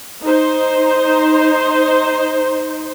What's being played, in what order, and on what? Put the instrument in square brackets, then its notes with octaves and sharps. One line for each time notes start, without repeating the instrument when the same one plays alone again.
[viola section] D#4 C5